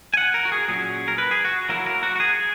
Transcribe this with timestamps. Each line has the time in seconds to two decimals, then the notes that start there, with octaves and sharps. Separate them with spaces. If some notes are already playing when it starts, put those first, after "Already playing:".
0.14 G#5
0.17 F#5
0.34 A#4
0.45 F#4
0.52 G#4
0.68 A#2 F#3 C#4 G#4
1.08 A#4
1.18 B4
1.31 G#4
1.45 F#4
1.69 F#3 A#3 E4 A#4
1.86 A#4
2.03 F#4
2.16 F#4
2.20 G#4